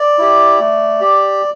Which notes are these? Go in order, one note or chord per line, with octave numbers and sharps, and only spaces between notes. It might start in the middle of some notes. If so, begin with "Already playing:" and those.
Already playing: D5
E4 G4
A3
G4